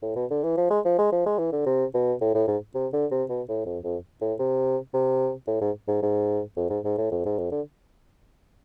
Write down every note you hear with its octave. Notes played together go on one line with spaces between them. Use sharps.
A2
B2
D3
E3
F3
G#3
F3
G#3
F3
G#3
E3
D3
C3
B2
A2
A2
G#2
C3
D3
C3
B2
A2
F2
F2
A2
C3
C3
A2
G#2
G#2
G#2
F2
G#2
G#2
A2
F2
G#2
F2
D3